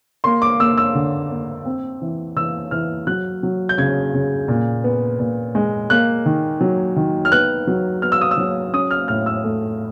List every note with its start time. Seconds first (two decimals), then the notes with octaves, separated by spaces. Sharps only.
0.24 A#3 C6
0.42 D6
0.59 A#3 E6
0.78 E6
0.95 D3
1.30 A#3
1.65 C4
2.02 E3
2.36 E3 E6
2.71 E3 F6
3.07 F#3 F#6
3.43 F#3
3.69 G6
3.78 C#3 G#6
4.14 C#3
4.48 A#2
4.84 B3
5.19 A#2
5.55 G#3
5.90 A#3 F#6
6.26 D#3
6.61 F#3
6.96 D#3
7.25 F6
7.32 B3 F#6
7.67 F#3
8.02 B3 F6
8.12 E6
8.21 D#6
8.31 E6
8.37 F#3
8.73 C#4 D#6
8.91 F6
9.08 A2 F6
9.26 E6
9.44 A3